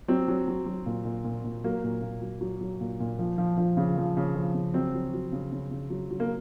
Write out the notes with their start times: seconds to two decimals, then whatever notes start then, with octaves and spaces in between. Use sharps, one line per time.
0.08 F#3 C4
0.28 F#3
0.48 F#3
0.66 F#3
0.86 A#2
1.05 A#2
1.24 A#2
1.44 A#2
1.64 F#3 A#3
1.84 A#2
2.02 A#2
2.21 F#3
2.41 F#3
2.61 F#3
2.81 A#2
3.00 A#2
3.19 F3
3.38 F3
3.57 F3
3.77 C#3
3.97 F3
4.17 C#3
4.35 F3
4.54 C#3
4.74 F#3 C4
4.94 F#3
5.13 F#3
5.33 C#3
5.52 C#3
5.71 C#3
5.90 F#3
6.11 F#3
6.20 A#3